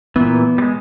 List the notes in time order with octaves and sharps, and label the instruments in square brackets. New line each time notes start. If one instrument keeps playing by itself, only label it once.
[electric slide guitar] A#2 E3 [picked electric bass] B3
[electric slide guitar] G3 G#3